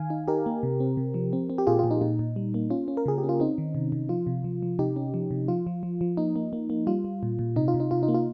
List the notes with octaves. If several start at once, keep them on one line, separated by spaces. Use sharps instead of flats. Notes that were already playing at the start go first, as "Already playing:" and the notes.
Already playing: D#3 F5 G#5
D#4
D#4 G4 A#4
A#3
C3
C4
C3
F3
C4
C4
G4
A#2 F4 G#4
A#2 F4
D#4
A#2 D#4
A#2
G3
A#3
C#4 F4
C#4
A#4
C#3 G#4
G4
C#4
F4
C4 D#4
D#3
C3
C3
F3 F4
C3
F3
F3
C3 D#4 G4
C#4
F3
C3
F3 F4
F3
F3
F3
A#3 D#4
A#3
A#3
A#3
G3 F4
G3
A#2
A#2
C3 D#4
F4
C3
D#4
C3 F4
D#4
A#3
F4